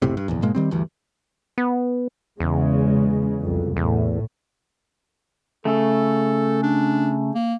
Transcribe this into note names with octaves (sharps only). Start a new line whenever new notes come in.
F#1 B1 A2 C3
G2
F1 A#1 E2
G#2 B2 G#3 A#3
D#3 G3 C4
D2 G2 E3
B3
E2 C#3 G#3
C2 F2
E2 A2
C#3 A3 A4
D4
A#3